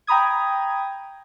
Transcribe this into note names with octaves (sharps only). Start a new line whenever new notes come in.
G5 A#5 B5 D#6 G#6